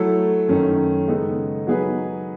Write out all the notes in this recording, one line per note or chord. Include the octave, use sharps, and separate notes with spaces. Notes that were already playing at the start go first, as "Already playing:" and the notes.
Already playing: F#3 A3 E4 A4
F#2 D#3 A3 C#4
C#3 G#3 B3 D#4 A4
F#3 B3 D#4 G#4 B4